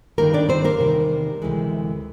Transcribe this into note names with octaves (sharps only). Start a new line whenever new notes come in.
G2 D#3 G3 A#3 A#4
D4 D5
C4 C5
A#3 A#4
E2 C3 D#3 G3
D2 C3 E3 G#3